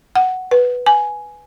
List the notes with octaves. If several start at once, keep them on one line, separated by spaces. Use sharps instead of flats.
F#5
B4
G#5